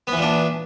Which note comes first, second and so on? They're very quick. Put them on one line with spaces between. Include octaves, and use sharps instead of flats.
B3 E3 A#2 D4